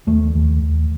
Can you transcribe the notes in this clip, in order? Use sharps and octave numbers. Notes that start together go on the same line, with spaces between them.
D#2 A3
D#2
D#2